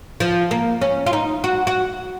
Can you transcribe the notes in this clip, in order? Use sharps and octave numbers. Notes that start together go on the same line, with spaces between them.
F3
A#3
C#4
F4
D#4
F#4
F#4